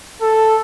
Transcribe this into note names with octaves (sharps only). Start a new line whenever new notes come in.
A4